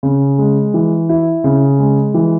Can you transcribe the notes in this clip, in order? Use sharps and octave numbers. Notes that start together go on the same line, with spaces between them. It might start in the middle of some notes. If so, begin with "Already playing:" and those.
C#3
G#3
E3
E4
C#3
G#3
E3